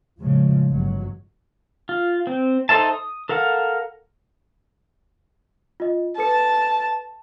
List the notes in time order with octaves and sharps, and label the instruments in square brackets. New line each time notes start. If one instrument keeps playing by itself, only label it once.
[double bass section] A2 C#3 F3 G#3
G1 F#3 G#3
[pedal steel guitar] F4
C4
D#4 A4 C5 E5 A5
D#6
A4 A#4 F5 F#5
[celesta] F4 D#5
[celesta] A4 B4 C#7 [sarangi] A5